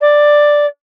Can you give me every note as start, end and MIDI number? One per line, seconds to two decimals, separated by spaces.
0.01 0.66 74